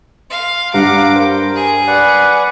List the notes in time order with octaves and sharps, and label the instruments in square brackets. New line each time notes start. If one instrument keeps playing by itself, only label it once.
[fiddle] F5 [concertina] C6
[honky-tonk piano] G2 [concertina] F5 F#5 A#5 [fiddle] D6
[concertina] A#4 C5 G5
[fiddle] G#4
[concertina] B4 D5 F#5